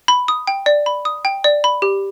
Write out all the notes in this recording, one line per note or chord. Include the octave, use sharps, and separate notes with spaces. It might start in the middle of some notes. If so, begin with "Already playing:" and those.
B5
D#6
G5
D5
B5
D#6
G5
D5
B5
G4